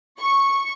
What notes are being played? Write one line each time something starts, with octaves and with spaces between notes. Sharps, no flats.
C#6